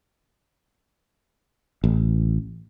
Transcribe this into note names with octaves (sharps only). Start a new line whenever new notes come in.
A1